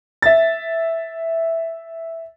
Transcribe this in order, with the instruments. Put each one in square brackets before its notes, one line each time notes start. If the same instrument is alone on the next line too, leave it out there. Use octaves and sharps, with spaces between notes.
[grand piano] E5 A6